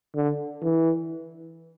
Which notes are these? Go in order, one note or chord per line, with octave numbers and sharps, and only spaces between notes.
D3
E3